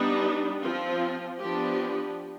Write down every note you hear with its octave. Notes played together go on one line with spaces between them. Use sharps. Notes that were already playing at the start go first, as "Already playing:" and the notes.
Already playing: G3 B3 D4 D#4
F3 C4 F4
F3 B3 D4 G4